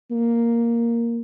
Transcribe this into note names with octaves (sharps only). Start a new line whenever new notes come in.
A#3